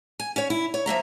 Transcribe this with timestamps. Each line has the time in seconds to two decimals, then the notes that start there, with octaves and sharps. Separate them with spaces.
0.20 G#5
0.36 C#4 C#5
0.50 E4
0.74 C#5
0.86 F3 A#3 E5 A#5